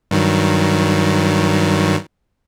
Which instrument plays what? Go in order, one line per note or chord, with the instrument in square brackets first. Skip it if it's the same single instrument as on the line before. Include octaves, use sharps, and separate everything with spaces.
[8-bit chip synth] G2 D#3 F#3